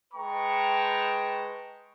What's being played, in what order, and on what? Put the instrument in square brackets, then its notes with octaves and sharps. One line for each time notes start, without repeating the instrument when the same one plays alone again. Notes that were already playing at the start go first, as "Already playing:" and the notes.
[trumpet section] G#3 B4 G5 A5 A#5 C#6